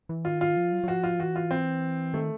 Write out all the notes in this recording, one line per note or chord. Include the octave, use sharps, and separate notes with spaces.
E3
D#3 F4
F4
F3
F#3
F#3
F3 F#4
F4
E3 F#4
F4
C4
D#3 A3